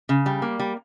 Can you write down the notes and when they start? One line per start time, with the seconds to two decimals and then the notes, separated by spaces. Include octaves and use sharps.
0.09 C#3
0.26 G3
0.42 A#3
0.59 G3